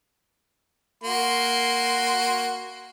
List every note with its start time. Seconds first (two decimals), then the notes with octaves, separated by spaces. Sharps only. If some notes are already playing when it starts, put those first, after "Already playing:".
1.04 A#3 F#4 C6